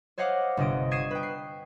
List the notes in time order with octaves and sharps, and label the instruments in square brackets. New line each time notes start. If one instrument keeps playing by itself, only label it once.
[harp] C5 C#5 D#5 F5 F#5 D6
G1 C3 D#5 D7
C#6 D#6 G#6 C7 D#7 E7
B4 G5
C7